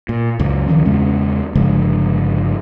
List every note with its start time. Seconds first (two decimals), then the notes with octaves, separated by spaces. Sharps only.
0.09 A#2
0.39 C#2 F#2
0.68 C#2 D#3 F3 C#4
0.85 E2 C#3 G#3 C#4
1.55 G1 C#3 F3 G#3